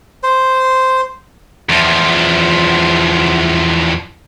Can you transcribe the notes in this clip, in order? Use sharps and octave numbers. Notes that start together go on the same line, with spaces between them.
C5
E2 F3